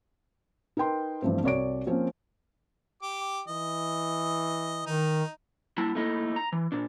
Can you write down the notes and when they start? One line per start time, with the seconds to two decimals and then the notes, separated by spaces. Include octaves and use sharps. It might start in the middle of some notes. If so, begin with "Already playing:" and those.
0.77 D#4 A#4 B4 G5 C6
1.22 G2 E3 F3 A3 C4
1.44 C2 F#4 C#5 D5 C#6 D7
1.86 F3 A#3 C4 C#4 F4
3.02 G4 D6
3.48 E3 D#5
4.86 D#3 D#4
5.78 G3 A#3 E4 A5
5.95 A3 A#3 D#4 E4 G#4 A4
6.36 A#5
6.52 E3
6.72 A#2 D4